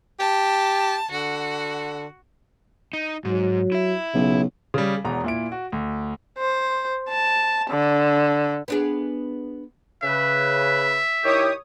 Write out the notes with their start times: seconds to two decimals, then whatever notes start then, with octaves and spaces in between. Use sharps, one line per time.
0.19 G4 A5
1.11 D3 F#4
2.93 D#4
3.25 G#2 F#3
3.72 E4 E5
4.14 B1 C#3
4.74 C#3 G3
5.04 E1 E2 A#5
5.24 A#2 E4 D7
5.52 F#4
5.72 D2
6.39 C5
7.09 A5
7.70 D3
8.68 B3 D4 G#4
10.03 C#3 B4 E5
11.24 D#3 E4 G4 C#5 D#6